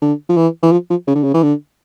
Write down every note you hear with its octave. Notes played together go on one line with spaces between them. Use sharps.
D3
F3
E3
E3
F3
F3
C#3
D3
C#3
E3
D3